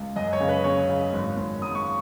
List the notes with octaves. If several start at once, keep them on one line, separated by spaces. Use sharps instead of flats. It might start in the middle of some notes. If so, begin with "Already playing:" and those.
Already playing: C#2
F#2 D#5
C#5
C#3
B4
C#3 C#5
C#3
G#1
G#1
G#2 D#6
C#6